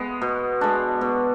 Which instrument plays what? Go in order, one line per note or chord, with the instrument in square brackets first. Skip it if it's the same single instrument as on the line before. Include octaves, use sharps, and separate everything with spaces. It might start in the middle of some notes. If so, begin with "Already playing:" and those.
Already playing: [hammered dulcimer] G#3 B3
B2
G#3 D4
B2